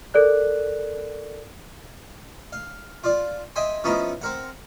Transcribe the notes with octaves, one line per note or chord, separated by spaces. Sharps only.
A4 A#4 D5 F#6
F5
F4 D5
D#5 E5 G5 G#5 C6
F3 B3 C#4 D#4 E4 D#5
C4 A#4 F#5